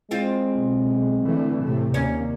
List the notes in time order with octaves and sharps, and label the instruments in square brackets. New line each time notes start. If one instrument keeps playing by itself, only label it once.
[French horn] G#3 [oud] C4 F4
[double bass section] B1
D3 E3 A3
A2 C3 A3
[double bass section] D#2 A#3 [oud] C#4